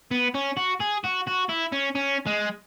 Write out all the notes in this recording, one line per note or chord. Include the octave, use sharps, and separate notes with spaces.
B3
C#4
F#4
G#4
F#4
F#4
E4
C#4
C#4
G#3